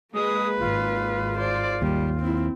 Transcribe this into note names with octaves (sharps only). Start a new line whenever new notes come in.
G#3 A#3 B4 D#6
G#1 F4
C5 D5
D#2 G3
C4 E4